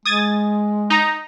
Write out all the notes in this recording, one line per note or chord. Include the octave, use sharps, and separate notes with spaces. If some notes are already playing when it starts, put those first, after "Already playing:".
G#3 D#6 G#6 A6
D#4 A#5